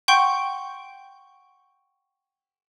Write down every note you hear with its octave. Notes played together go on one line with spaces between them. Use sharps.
F#5 G5 C6 C#6 G6